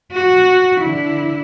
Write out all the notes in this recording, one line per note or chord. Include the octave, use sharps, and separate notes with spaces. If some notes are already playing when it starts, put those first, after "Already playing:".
F#4
D3 E4